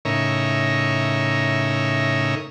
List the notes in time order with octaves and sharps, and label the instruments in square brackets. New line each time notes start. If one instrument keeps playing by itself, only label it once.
[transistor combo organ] A2 C#3 D#4 A#4 C#5 E5